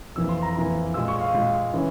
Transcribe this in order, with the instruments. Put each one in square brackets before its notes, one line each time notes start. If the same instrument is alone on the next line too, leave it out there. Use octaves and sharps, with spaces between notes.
[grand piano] F2 E3 A#3 E6
C6
A#5
F2 E3 A#3 A#5
A#2 G#3 E6
C#6
F5
A#2 G#3
C#3 E3